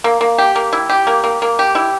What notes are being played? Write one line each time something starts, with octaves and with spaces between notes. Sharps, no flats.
A#3
A#3
G4
A#3
E4
G4
A#3
A#3
A#3
G4
E4